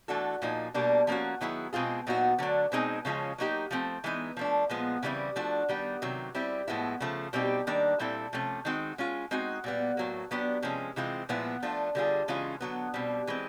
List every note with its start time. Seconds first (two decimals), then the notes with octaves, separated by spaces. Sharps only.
0.08 E3 A3 D4 F#4 A4
0.42 A#2 F3 A#3 D#4
0.74 B2 G3 A#3 D4
1.07 F3 A#3 C#4 F#4
1.41 D#3 F#3 B3 E4 G#4
1.73 B2 G#3 C4 F4 G#4
2.07 A#2 F#3 B3 D#4 F#4
2.38 D3 F#3 A3 D4
2.72 B2 G#3 C4 D#4 G#4
3.05 C#3 F3 G#3 C#4 F4
3.38 F#3 A#3 D#4 G4
3.71 F3 A3 C4
4.04 E3 G#3 B3 D#4
4.37 F3 A3 D4
4.69 A#2 F3 G#3 B3
5.03 C#3 E3 G3 C4 E4
5.36 F3 A3 D4 F#4
5.69 D#3 G3 B3
6.02 C3 D#3 F#3
6.35 G3 C4 E4
6.68 A2 F3 G#3 B3 E4
7.00 C#3 F3 A3
7.33 B2 G3 C4 D#4 G4
7.67 D#3 G3 A#3 D4
7.99 A#2 G3 C4 E4 A4
8.33 C3 F3 A3 C#4
8.65 D#3 G#3 C4 D#4 F#4
8.98 G#3 C#4 F4
9.31 G#3 C4 D#4 F#4
9.64 A#2 G3 B3
9.97 A2 F#3 A#3
10.31 F#3 B3 D4 G4
10.63 C3 F3 G#3 C#4
10.96 C3 E3 G#3 C4 F4
11.29 A#2 F3 G#3 B3 E4
11.63 F3 A3 D4 F4
11.95 D3 G3 C4 F4 G#4
12.28 C#3 E3 G#3 C#4 F4
12.61 D3 F#3 B3
12.94 B2 G3 C4
13.27 E3 G#3 C4